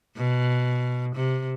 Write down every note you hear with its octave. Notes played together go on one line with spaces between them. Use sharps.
B2
C3